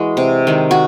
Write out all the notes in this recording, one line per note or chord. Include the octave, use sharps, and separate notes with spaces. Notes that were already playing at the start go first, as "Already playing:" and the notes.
Already playing: E3 G#3 F#4
C3
D#3 G#3
F#4